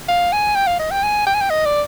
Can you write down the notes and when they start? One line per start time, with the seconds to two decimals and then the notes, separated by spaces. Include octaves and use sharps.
0.08 F5
0.32 G#5
0.55 G5
0.67 F5
0.79 D#5
0.91 G5
1.03 G#5
1.27 G5
1.34 G#5
1.41 G5
1.50 D#5
1.65 D5